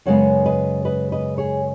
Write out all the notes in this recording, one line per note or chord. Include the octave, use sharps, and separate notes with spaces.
F#2 C#3 G#3 B3 C#5 F#5
B4 D#5
B4 D#5
B4 D#5
G#4 C#5